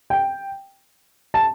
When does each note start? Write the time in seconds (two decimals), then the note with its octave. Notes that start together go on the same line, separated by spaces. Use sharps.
0.10 G5
1.34 A5